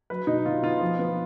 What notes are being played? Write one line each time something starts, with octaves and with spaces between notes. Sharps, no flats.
F#3 B4
B2 D#4
B2 F4
B3 F4
F3
B3